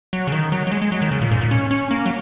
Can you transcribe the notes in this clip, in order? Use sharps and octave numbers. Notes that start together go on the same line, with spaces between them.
F#3
C#3
D#3
F#3
F#3
G#3
G#3
F#3
D#3
C#3
A#2
G#2
A#2
C#4
C#4
A#3
F#3